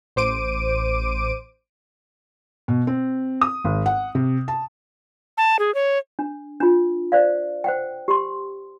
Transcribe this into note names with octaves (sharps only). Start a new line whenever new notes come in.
A1 C5 D6 D7 D#7
B2
C4
D#6
G#1
F#5
C3
A5
A5
G#4
C#5
D4
D4 F4
C5 D5 F5
C5 F#5 G5
G4 C6